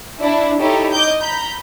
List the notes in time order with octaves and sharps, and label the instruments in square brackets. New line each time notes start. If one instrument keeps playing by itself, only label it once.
[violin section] D4 E4
D#4 E4 G4 A4 C#5
D#5 D6 G6
A#5 B5 G6